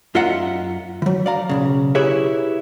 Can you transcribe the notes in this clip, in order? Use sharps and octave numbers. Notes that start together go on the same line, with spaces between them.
F#2 F4 D#5 E5 F#5 A#5
E3 F#3
D5 F5 A#5
B1 G2 C#3
E4 G4 G#4 B4 C#5 E5